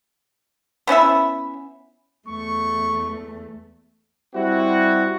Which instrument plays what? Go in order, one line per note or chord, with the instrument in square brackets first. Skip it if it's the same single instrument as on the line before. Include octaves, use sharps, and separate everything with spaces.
[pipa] B3 C#4 E4 E5
[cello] E2 A3 [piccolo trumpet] C#6
[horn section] G3 C4 E4 F#4